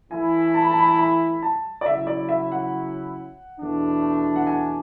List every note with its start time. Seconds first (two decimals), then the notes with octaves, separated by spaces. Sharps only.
0.11 E3 A3 E4 G#5
0.54 A5
0.63 B5
0.71 A5
0.78 B5
0.87 A5
0.99 B5
1.42 A5
1.81 D5
1.86 C#3 F#3 C#4 E4 E5
2.07 D5
2.29 E5
2.52 F#5
3.59 E2 B2 A3 D4
4.36 F#5
4.47 G#5